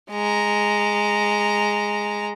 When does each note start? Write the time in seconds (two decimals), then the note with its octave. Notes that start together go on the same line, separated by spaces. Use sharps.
0.11 G#3 A#5